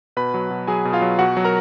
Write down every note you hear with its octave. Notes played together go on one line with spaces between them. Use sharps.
B2 B4 B5
F#3
B2
F#3 G#4 G#5
B2
F4 F5
F#3
B2 F#4 F#5
F#3
A#4 A#5